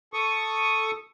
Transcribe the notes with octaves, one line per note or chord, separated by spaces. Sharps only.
A4 C#6 D#6